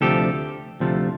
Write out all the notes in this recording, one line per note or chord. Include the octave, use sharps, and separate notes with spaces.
D2 C3 F3 A3 G4 A4
D2 C3 F3 A3